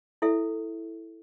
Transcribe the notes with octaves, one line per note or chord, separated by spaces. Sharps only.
E4 A4 E5